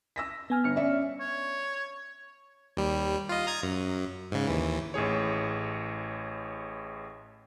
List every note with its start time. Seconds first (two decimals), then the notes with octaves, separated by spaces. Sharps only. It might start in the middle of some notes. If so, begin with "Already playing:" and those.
0.16 E6 A#6 B6
0.50 B3 G#5 F6
0.64 G1 F6 C#7
0.76 C#4 D5 E5
1.20 C#5
2.77 D#2 G3
3.29 F4 D#5
3.47 A#5 D#6 G#6
3.63 F#2
4.32 G#2 C#3
4.47 D#2 E3
4.94 A1 A2 G#4 C#5